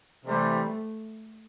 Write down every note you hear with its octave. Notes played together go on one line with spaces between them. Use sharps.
C3 E3 G3 A3